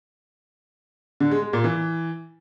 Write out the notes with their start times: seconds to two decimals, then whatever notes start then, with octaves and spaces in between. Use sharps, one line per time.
1.20 D3
1.31 G#3
1.42 G#3
1.53 A#2
1.64 E3